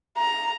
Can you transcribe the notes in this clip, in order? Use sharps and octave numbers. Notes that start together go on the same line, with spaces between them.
A#5